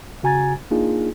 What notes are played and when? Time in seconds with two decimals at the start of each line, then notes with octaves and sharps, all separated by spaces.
0.23 C#3 F#4 G#5 A#5 G#6 A6
0.71 A#3 D4 D#4 F4 G#4